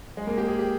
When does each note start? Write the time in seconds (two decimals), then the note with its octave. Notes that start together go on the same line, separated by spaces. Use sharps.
0.17 G#3
0.27 A#3
0.38 G4
0.48 G#4
0.59 G4